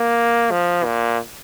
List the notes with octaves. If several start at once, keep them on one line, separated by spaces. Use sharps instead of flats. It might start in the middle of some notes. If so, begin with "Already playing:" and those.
Already playing: A#3
F3
A#2